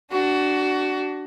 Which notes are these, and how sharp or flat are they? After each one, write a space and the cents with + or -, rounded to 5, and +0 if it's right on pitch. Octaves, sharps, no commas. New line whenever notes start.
D4 +0 F#4 +20